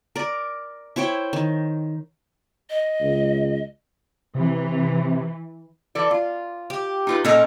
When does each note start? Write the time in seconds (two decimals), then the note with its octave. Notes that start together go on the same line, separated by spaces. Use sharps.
0.16 A#4 D5
0.96 E4 C5 C#5 G5
1.33 D#3
2.70 D#5
3.01 C#2
4.35 C3 E3
5.95 E3 A4 D5
6.11 F4
6.70 G4
7.07 D#4 F4 B4
7.25 A#2 C#4 D#4 A4 A#4